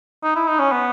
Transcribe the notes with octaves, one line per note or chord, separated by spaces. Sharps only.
D#4
E4
D#4
C#4
B3